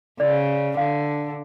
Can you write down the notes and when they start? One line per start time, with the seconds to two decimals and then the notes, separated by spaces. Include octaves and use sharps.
0.20 C#3 D5
0.77 D3 F5